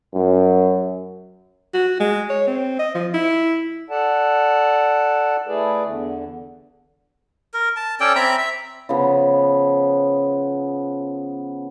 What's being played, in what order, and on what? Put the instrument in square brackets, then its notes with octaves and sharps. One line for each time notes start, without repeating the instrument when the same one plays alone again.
[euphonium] F#2
[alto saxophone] F#4
G#3
C#5
C4
D#5
F3
E4
[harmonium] A4 D5 F#5 A5
A3 E4 G#4 B4 D5
E2 D3
[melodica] A#4
A5
C#4 A4 D5 G5
C4 E5 A#5 B5
E5
[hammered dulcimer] C#3 F3 B3